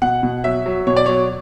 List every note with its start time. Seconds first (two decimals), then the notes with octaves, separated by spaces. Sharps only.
0.02 B2 F#5
0.23 B2
0.44 F#3 E5
0.66 F#3
0.87 B2 C#5
0.97 D5
1.06 F#3 C#5